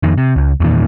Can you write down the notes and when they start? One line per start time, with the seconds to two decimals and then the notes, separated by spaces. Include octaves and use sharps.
0.03 F2 D#3
0.18 C3
0.36 C#2
0.60 E2 G2 A#2 D#3